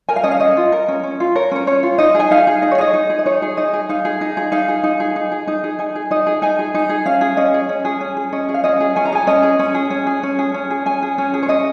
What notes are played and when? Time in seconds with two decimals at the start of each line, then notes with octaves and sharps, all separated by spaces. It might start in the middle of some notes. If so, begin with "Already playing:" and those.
0.09 A#4 G#5
0.16 F5
0.24 C#4 D#5
0.31 F5
0.40 C#4 D#5
0.57 F4
0.72 A#4
0.88 C#4
1.03 C#4
1.20 F4
1.35 A#4 C#5
1.52 C#4 C#5
1.67 C#4 C#5
1.83 F4
1.98 D#4 D#5
2.15 G#4
2.20 G#5
2.31 D#4 F5
2.47 G#4
2.62 D#4 D#5
2.71 C#5
2.78 G#4 D#5
2.93 D#4
3.10 G#4
3.19 D#5
3.26 D#4 C#5
3.42 G#4
3.57 D#4 D#5
3.73 G#4
3.89 D#4 F5
4.05 G#4
4.21 D#4
4.37 G#4
4.52 D#4 F5
4.68 G#4
4.83 D#4
5.00 G#4
5.16 D#4
5.32 G#4
5.47 D#4
5.64 G#4
5.79 D#4 G#5
5.95 G#4
6.11 D#4 D#5
6.27 G#4
6.42 D#4 G#5
6.59 G#4
6.74 D#4
6.89 G#4
7.06 C#4 F5
7.21 G#4
7.37 C#4 D#5
7.54 G#4
7.69 C#4
7.85 G#4
8.01 C#4
8.17 G#4
8.33 C#4 D#5
8.49 G#4
8.54 F5
8.64 C#4 D#5
8.80 G#4
8.96 C#4 G#5
9.05 A#5
9.12 G#4 G#5
9.27 C#4 D#5
9.43 G#4
9.59 C#4
9.75 G#4
9.90 C#4
10.07 G#4
10.23 C#4
10.39 G#4
10.54 C#4
10.71 G#4
10.86 C#4 G#5
11.03 G#4
11.18 C#4
11.34 G#4
11.43 C#5
11.49 C#4 D#5